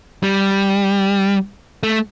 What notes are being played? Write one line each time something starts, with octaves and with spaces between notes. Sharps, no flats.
G3
A3